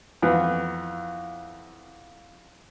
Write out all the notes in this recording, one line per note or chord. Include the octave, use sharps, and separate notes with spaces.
F2 E3 B3